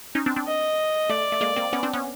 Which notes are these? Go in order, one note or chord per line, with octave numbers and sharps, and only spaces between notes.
C#4 D#4
C4 D4
C4 D4
D#5
A3 D5
A3
G#3 A#3
A#3 C4
B3 C#4
C4 D4
B3 C#4